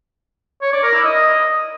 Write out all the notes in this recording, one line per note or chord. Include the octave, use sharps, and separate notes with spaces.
C#5
D5
A#4
E4
D#5